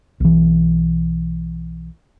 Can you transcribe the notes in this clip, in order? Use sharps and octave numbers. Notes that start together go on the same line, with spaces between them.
B1 E3